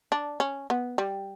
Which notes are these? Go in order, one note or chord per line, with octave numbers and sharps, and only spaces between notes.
D4
C#4
B3
G3